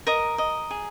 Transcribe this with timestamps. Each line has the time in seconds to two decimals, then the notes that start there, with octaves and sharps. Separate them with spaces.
0.07 A#4 D#5 A#5
0.38 D#5
0.71 G#4